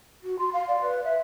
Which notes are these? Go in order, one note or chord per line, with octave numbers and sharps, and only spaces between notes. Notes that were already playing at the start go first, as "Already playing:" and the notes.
F#4
C6
F5
D5
B4
E5